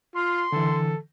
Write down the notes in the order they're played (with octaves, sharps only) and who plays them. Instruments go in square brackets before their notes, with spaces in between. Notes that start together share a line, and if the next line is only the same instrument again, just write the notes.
[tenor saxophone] F4 [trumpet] C6
[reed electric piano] D3 E3 [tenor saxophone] A4